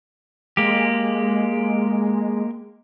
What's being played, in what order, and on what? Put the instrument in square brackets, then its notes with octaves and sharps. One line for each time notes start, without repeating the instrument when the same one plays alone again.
[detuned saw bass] G#3 [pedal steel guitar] A#3 G4